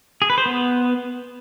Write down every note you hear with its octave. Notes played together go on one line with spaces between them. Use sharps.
G#4
B4
C5
B3